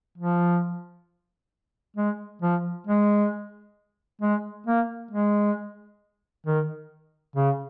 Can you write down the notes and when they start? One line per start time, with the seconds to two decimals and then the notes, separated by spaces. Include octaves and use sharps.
0.18 F3
1.96 G#3
2.42 F3
2.87 G#3
4.21 G#3
4.67 A#3
5.11 G#3
6.46 D#3
7.36 C#3